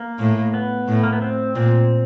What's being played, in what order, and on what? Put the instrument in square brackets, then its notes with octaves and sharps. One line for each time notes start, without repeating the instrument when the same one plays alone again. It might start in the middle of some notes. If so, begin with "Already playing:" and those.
Already playing: [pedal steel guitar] A#3
[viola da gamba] A2
[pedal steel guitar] B3
[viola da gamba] A2
[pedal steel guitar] A#3
B3
C4
[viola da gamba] A#2 [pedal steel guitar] C4